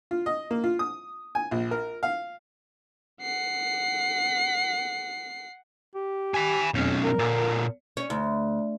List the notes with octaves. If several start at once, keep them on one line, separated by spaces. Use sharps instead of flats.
F4
D#5
A#3
F4
D#6
G#5
A#1
A#4
F5
F#5 C7
G4
G#5 B5
B1 F2 C#4
A#4
A#2 D3
C#4
D2